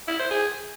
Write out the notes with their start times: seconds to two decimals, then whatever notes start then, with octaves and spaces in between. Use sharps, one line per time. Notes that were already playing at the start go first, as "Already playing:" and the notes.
0.08 E4
0.19 C5
0.31 G#4